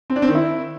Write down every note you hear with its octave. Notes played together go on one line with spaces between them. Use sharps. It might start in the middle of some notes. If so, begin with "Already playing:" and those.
C4
D4
C4
D#3
E4